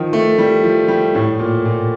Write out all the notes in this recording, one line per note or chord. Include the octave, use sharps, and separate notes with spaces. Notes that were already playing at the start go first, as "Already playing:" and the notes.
Already playing: D#3 F3
A3
G3
F3
G3
A2
A#2
A#2